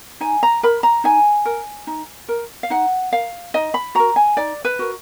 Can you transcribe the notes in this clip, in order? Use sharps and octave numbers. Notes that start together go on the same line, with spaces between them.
D#4 G#5
A#5
A#4 B5
A#5
D#4 G#5
A#4
D#4
A#4
F5
D#4 F#5
A#4 F5
D#4 D#5
B5
F#4 A#4 A#5
G#5
D#4 D5
B4
F#4 A#4